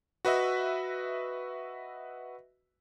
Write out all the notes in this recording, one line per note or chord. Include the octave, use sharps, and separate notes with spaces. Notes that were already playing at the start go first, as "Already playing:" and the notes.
F#4 B4 D#5 E5